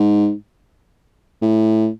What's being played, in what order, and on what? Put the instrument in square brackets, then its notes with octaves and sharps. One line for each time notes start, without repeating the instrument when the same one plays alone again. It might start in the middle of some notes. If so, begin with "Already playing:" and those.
Already playing: [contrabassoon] G#2
A2